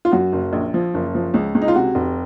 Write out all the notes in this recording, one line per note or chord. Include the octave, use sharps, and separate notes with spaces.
F4
F#2 F#4
F#1
A#1
F3
F#1
F3
C#2
C#2
D#4
F4
C3 F#4
F1